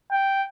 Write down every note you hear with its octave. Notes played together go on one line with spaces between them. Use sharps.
G5